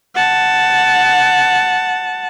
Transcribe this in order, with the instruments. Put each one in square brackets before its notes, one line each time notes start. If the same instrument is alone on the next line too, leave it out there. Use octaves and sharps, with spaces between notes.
[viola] F#5 A5